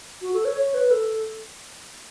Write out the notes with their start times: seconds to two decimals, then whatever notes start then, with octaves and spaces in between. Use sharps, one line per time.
0.22 F#4
0.34 A4
0.45 C#5
0.56 C#5
0.74 B4
0.91 A4